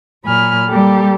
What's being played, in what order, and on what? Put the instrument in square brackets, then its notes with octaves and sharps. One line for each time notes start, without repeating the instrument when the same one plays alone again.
[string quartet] A#2 F#3 G#5 B5 F6
G3 A#3 G4 A4